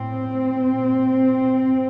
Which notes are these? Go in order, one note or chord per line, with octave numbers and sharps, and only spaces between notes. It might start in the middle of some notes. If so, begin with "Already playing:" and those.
Already playing: A2 C4
A#2